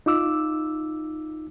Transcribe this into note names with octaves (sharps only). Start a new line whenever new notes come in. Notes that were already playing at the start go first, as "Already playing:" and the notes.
D#4 F4 D6 E6